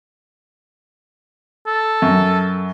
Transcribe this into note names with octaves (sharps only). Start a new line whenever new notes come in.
A4
F#2